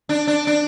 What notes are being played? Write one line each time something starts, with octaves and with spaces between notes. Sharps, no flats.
D4
D4
D4